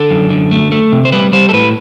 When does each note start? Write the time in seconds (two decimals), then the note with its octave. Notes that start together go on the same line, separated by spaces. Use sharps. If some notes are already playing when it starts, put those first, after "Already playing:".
Already playing: D3 A4
0.11 F#2
0.30 D3
0.51 A3
0.72 A3
0.92 C3
1.05 C5
1.12 G3 B4
1.33 G3 C5
1.49 A4
1.53 A2 B4